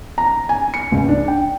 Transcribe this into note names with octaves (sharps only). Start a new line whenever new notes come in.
A#5
G#5
C#7
C#2
D4
G5